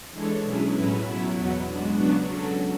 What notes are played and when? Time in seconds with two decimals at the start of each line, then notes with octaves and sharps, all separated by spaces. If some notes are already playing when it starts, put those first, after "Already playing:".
0.12 E3 G#3 D4 A4 C#5
0.42 B2 F#3 C#4 E4 G#4
0.73 A2 F#3 C#4 E4 B4
1.04 B2 F#3 B3 E4
1.35 E2 B2 F#3 B3
1.66 G#3 D4 F#4
1.96 C#3 F#3 B3 D4 F#4
2.27 F#3 C#4 F#4 A4